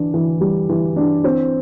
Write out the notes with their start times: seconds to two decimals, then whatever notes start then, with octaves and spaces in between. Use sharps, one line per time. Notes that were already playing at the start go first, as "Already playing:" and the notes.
Already playing: E3 D4
0.14 E3
0.41 G3
0.69 E3
0.96 D4
1.24 C4